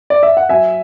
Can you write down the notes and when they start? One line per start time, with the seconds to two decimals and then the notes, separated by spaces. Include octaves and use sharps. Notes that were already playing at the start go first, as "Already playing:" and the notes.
0.10 D5
0.23 E5
0.37 F#5
0.49 F#3 E5 G#5